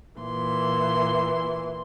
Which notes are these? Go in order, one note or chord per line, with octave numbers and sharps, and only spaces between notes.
A#2 E3 C6